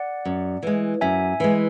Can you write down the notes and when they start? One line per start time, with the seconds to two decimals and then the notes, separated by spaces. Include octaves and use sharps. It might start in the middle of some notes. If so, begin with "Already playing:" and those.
Already playing: D5 F#5
0.25 F#2
0.63 E3 G#3
1.01 F#2 E5 G#5
1.40 E3 G#3